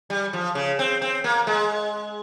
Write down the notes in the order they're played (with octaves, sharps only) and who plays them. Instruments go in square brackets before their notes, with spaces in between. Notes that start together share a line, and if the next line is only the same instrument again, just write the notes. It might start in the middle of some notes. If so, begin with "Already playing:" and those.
[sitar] G3
F3
C#3
C4
C4
A#3
G#3